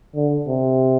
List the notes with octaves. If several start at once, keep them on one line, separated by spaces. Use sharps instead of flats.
D3
C3